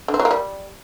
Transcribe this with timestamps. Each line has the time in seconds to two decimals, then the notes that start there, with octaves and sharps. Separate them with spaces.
0.08 D3
0.14 C4
0.20 F#3
0.25 A#3
0.31 G3